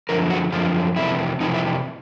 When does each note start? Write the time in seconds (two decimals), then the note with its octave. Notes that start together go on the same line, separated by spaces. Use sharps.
0.09 F#2 D3 F3 A#4
0.30 F#4
0.52 F#2 D3 F3 F4
0.96 F2 C3 E3 E4
1.40 F2 C3 E3 D#4
1.54 E4